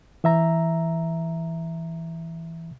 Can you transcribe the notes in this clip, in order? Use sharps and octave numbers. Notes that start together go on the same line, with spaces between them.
E3 E5 A#5